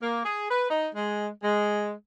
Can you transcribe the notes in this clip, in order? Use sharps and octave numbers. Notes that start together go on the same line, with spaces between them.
A#3
G#4
B4
D#4
G#3
G#3